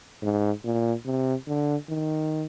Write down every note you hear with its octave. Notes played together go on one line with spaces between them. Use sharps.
G#2
A#2
C3
D3
D#3